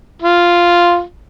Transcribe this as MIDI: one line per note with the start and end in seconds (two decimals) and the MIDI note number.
0.22 1.03 65